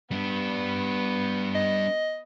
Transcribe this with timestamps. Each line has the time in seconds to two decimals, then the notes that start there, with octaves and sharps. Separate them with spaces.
0.11 G3 B3 D4
1.55 D#5